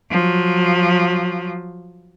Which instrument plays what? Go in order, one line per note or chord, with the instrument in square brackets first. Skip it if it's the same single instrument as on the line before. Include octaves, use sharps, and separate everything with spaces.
[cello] F3 F#3